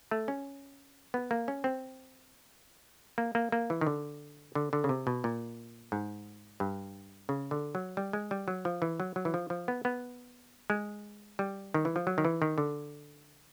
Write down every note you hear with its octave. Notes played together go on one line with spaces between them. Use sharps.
A3
C#4
B3
A#3
C#4
C4
A#3
A#3
A#3
E3
D#3
D3
D3
D3
C#3
C3
B2
A#2
G#2
G2
C#3
D3
F#3
G3
G#3
G3
F#3
F3
E3
F#3
F#3
E3
F3
F3
B3
B3
G#3
G3
D#3
E3
F3
F#3
D#3
E3
D#3
D3